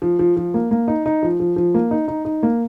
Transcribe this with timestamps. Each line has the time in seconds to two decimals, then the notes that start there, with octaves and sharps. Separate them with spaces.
0.02 F3
0.19 F3
0.37 F3
0.54 A#3
0.71 A#3
0.88 D#4
1.06 D#4
1.23 F3
1.40 F3
1.56 F3
1.74 A#3
1.91 D#4
2.08 D#4
2.25 D#4
2.43 A#3